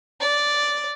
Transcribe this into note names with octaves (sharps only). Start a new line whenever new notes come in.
D5